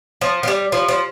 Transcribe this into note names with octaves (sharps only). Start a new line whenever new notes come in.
F3
F3
G3
F3
F3